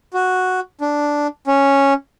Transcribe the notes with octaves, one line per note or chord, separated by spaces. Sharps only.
F#4
D4
C#4